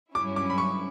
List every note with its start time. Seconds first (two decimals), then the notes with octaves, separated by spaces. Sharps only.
0.15 G2 F#3 C#4 E4 D6
0.36 D6
0.50 B5
0.58 C#6